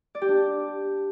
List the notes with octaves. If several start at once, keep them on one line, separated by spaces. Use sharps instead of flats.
D5
G4
D4